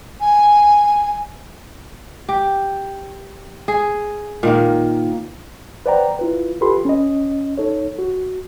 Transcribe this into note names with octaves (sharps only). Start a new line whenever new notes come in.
G#5
G4
G#4
A#2 D#3 A#3
B4 C5 D5 F#5 G5 A#5
E4 F4 B4
F4 G4 A4 B4 B5 C6
C#4 D#5
D#4 A4 C#5
F#4